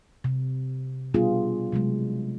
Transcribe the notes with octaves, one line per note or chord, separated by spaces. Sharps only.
C3
B2 G3 B3 D4 F4 G#4
C3 F#3 G#3